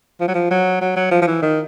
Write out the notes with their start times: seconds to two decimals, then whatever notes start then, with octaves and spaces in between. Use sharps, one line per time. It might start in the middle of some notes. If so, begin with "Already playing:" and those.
0.21 F3
0.28 F#3
0.35 F3
0.51 F#3
0.81 F#3
0.96 F#3
1.11 F3
1.22 F3
1.27 E3
1.42 D#3